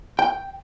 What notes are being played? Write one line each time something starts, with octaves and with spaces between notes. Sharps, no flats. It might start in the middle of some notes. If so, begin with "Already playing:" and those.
G5